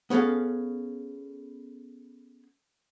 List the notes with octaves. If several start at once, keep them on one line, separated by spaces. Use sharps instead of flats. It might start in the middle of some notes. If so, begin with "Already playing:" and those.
B3 C#4 G#4 A4 F5